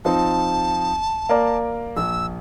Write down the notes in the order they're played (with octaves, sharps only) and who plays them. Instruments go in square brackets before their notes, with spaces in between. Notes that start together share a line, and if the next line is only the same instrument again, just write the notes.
[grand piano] F3 C4 D#4 [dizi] A5
[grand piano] A#3 A#4 D5
[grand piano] A#1 [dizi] E6